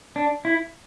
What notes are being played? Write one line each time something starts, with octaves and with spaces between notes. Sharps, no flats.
D4
E4